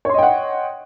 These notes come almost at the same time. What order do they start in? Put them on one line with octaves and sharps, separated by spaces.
C#5 C6 D#5 G5 F#5